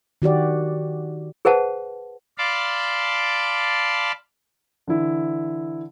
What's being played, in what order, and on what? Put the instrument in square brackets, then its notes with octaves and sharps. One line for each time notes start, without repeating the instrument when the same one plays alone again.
[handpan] D#3 F#4 G4 D5
[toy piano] G#4 B4 C5 F#5 A5
[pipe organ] D5 F5 A5 B5 C6 D6
[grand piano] D3 E3 E4